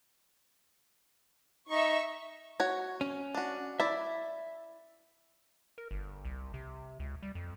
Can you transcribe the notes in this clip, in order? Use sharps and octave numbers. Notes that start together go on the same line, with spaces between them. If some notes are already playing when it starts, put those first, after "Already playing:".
D#4 E5 C#6
F#4 C#5
C#4
D4 F#4
E4 D5 E5
A#4
G1
C2
C3
C#2
G3
F2